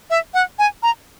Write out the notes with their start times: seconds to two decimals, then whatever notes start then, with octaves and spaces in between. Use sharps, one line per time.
0.10 E5
0.34 F#5
0.59 G#5
0.83 A#5